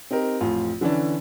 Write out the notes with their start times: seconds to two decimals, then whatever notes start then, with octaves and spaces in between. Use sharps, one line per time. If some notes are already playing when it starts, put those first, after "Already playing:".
0.11 C4 D#4 G4 A#4
0.40 A1 F2 F4
0.81 D3 E3 C#4 D4